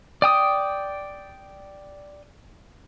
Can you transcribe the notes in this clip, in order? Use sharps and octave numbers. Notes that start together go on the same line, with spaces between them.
D5 G5 D#6